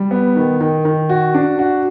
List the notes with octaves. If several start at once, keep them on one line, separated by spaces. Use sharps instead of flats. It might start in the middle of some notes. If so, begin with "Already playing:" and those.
Already playing: G3
B3
D#3
D#3
D#3
F#4
D4
F#4